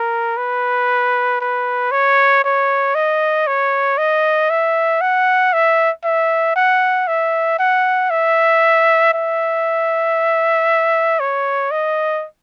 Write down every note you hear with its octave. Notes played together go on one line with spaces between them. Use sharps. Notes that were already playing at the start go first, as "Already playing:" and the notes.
Already playing: A#4
B4
B4
C#5
C#5
D#5
C#5
D#5
E5
F#5
E5
E5
F#5
E5
F#5
E5
E5
C#5
D#5